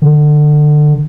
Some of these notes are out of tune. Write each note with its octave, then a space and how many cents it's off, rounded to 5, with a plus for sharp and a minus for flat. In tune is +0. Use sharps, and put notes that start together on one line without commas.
D3 +25